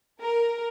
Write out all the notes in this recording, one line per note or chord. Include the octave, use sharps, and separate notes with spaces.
A#4